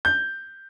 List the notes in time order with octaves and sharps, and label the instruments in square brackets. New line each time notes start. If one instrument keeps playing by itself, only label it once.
[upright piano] G6